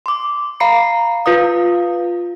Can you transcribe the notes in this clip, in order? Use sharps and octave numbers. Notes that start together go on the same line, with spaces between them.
C6 D6
F5 A#5 B5 C7 C#7
F4 B4 F5 D#6